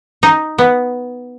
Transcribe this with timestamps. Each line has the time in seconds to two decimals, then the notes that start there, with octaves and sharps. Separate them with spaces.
0.23 D#4
0.58 B3